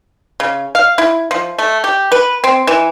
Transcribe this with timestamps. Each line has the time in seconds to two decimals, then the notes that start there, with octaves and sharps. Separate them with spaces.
0.40 C#3
0.75 F5
0.98 E4
1.31 F3
1.58 A3
1.84 G4
2.12 B4
2.44 C4
2.67 E3